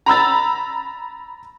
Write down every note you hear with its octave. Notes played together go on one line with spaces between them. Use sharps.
A#5 B5 E6 A6